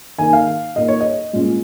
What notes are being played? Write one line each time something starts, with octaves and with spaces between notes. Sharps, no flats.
D#3 A#3 D#4 G#5
F5
A#2 A#3 D#4 D#5
C#5
D#5
A#2 G#3 C#4 F4